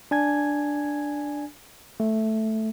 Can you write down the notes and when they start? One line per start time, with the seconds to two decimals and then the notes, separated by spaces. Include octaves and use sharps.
0.11 D4 G#5 G#6
2.00 A3